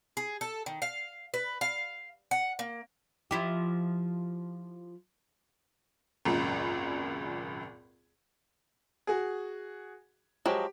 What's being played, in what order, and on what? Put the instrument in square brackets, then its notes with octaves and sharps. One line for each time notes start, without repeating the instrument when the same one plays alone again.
[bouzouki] G#4
A4
D#3
F5
B4
F5
F#5
A#3
[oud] F3 E4 G4
[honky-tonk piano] G#1 C#2 F#2 A#2
[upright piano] F#4 G#4
[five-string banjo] F3 F#3 G#3 [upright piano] G4